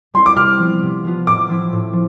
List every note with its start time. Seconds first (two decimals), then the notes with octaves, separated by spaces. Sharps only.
0.14 G3 C4 E4 C6
0.26 D6
0.36 C3 F6
0.59 F3 B3 F4
0.83 C3
1.05 F3 B3 F4
1.27 A2 D6
1.49 F3 C4 E4
1.73 A2
1.93 F3